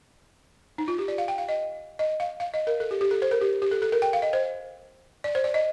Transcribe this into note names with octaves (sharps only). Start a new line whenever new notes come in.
D#4
F4
G4
D5
F5
G5
F5
D#5
D#5
F5
F5
D#5
A#4
A4
G4
G4
A4
C5
A#4
G4
G4
A4
A4
A#4
G5
F5
D#5
C5
D5
C5
D5
D#5